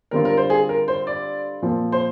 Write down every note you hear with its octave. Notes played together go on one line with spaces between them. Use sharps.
D3 G3 C4 F4 A#4
A#4
C5
G#4
A#4
C5
D5
A#2 F3 C4 F4
C5